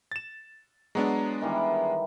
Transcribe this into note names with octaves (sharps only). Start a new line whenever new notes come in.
A6 E7
F#3 G#3 B3 D4
D#3 E3 G3